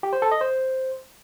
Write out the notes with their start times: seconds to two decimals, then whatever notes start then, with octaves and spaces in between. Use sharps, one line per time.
0.03 G4
0.13 C5
0.22 A4
0.32 D#5
0.41 C5